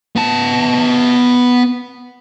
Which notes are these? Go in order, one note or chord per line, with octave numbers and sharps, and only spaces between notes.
B3 A5